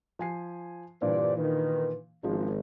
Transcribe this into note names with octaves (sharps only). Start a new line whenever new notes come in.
F3 G#5 C7
G2 A#2 D3 E3 C5 D5
D#3 B4
G#1 F3 G#3 C#4